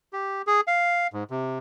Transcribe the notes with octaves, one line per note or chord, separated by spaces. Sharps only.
G4
G#4
F5
G#2
C3